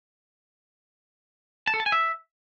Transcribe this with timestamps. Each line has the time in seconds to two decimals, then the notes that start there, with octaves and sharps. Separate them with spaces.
1.67 A5
1.74 A4
1.80 A5
1.86 G#5
1.92 E5